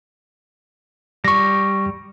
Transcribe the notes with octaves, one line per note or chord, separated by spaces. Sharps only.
G3 C#6 A#6